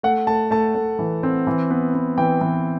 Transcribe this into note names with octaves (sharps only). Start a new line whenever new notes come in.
A3 F#5
A3 A5
A3 A5
A3
E3
C4
E3
B3
B3
E3 G5
E3